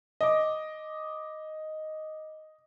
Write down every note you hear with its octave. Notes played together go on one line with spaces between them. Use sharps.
D#5 D6